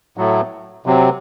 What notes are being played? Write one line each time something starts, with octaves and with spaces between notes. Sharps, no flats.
A2 F#3 A3
C3 F#3 C4